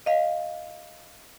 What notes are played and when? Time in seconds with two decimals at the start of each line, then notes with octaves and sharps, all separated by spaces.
0.06 D#5 F5